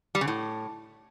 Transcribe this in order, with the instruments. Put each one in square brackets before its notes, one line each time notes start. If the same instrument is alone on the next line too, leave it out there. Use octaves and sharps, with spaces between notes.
[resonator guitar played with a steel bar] G3
C#3
A2